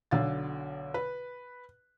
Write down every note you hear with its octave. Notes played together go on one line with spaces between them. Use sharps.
B1 D3 F5 A6
B4